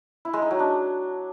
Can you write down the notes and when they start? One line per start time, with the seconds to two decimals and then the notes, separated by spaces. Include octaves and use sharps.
0.25 E4
0.34 G#3
0.42 D#4
0.51 F#3
0.59 D4